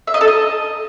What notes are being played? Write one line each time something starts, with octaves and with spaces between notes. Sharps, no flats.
E5
D#5
A4
D#5